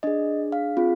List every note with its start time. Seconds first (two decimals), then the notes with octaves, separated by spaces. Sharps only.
0.03 D4 G#4 D#5
0.52 F5
0.77 C4 F4 G#4